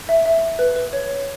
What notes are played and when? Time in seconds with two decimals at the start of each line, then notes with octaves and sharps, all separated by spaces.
0.09 E5
0.25 E5
0.59 B4
0.76 B4
0.93 C#5